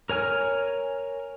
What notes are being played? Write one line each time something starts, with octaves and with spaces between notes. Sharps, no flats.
A#4 C#5 G#5 F6